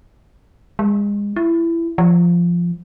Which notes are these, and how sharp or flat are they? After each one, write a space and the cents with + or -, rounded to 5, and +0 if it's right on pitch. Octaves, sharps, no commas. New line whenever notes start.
G#3 -30
E4 +20
F3 -10